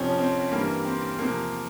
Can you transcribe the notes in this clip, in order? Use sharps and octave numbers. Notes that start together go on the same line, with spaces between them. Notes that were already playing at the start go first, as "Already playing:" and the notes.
Already playing: F2 C3 F3 C#4
C4
G2 E3 G3 A#3
C4
E2 C3 F3 A#3